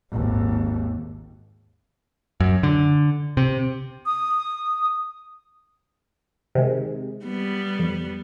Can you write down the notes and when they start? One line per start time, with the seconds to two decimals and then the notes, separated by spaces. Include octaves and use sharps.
0.11 G#1 D#2
2.40 F#2
2.63 D3
3.37 C3
4.06 D#6
6.55 C3 D#3 G#3
7.25 G3 B3
7.79 F2